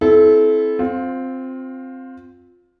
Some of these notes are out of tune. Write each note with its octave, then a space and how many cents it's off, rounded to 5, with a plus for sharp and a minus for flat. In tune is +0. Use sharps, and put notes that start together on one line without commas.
C4 +0 E4 +0 A4 -30
C4 +0 F4 +20